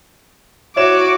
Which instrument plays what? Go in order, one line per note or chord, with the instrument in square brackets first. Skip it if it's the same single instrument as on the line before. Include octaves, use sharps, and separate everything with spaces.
[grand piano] E4 C#5 E7 [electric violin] F#4 D6